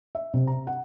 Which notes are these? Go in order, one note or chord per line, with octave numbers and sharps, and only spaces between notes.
E5
C3
A#5
F#5